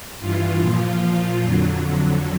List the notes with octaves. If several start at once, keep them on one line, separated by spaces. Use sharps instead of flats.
G2 E3 F4
A#2 F3
A#2 F3
F2 D3 F#3